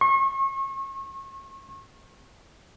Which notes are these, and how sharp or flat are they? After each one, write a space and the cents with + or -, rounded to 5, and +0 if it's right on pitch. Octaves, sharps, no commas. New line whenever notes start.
C#6 -35